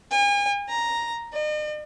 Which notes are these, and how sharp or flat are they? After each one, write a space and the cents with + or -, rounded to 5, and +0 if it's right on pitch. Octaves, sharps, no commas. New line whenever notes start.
G#5 -40
A#5 +5
D#5 -45